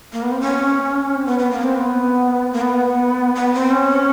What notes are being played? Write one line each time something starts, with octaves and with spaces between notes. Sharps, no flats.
A#3
B3
C4
C#4
C4
B3
B3
A#3
C4
B3
A#3
B3
B3
C4
C#4